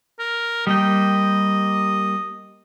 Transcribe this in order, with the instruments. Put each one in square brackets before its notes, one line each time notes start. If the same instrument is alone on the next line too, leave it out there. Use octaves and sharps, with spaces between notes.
[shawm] A#4
[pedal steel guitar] G3 A#3 G5 [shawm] D#5